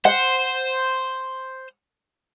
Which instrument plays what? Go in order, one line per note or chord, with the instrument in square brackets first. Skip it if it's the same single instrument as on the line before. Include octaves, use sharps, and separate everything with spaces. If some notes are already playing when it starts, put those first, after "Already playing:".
[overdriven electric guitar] C5 [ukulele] F#5